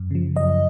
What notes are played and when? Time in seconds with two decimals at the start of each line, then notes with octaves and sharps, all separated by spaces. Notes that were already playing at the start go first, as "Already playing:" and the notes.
Already playing: F#2
0.11 C#3 F3
0.36 F#2 D#5